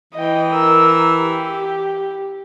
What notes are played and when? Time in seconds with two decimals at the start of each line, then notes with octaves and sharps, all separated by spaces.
0.13 E3 D#5 G5
0.53 A#4 E6
1.21 G4